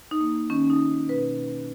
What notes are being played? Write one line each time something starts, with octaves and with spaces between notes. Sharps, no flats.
D#4
A#3
D#3 C#4
D#4
C#4
B2 B4